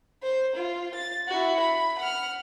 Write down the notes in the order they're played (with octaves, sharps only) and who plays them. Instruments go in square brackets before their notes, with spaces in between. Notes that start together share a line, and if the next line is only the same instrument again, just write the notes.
[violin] C5
F4
A6
E4 F#4
B5
F#5 F6